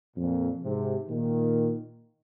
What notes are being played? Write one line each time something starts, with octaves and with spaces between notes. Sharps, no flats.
F2 A#2
G#2 C3
A#2 D#3